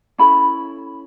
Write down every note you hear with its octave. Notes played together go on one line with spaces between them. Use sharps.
C#4 E4 A4 B5